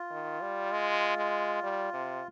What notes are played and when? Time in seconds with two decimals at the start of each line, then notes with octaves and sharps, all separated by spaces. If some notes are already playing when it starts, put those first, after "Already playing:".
Already playing: F4
0.11 D#3
0.41 G3
0.72 G#3
1.17 G#3
1.63 G3
1.93 C3